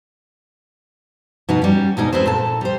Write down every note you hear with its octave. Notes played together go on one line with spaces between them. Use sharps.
B2 B3 D#4
G3 C#4
D2 B2 G#3 D#4
C4 G#4 B4 C5
A#2 A4 A5
G3 C5